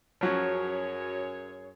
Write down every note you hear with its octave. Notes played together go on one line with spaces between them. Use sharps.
F#2 F3 F#3 C#4 G#4 C#5